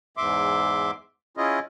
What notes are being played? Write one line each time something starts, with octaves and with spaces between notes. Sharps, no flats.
E2 G#2 E5 C6 D6
C#4 E4 F4 G#4 D#5